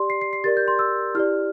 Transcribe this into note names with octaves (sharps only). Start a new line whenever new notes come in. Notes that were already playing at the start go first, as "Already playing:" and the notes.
Already playing: G4 D5 C6
C7
C7
C7
G4 A#4 D5 A6
G6
C6
E6
E4 G4 D5 F6